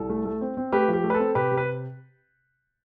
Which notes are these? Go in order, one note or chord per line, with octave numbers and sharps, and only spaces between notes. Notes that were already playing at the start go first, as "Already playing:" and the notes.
Already playing: C2 A4
A3
A3
C4
C4
A3 G4 B4
F3
G4
A3
B4
C4 A4
C3 G4 B4
C3
B4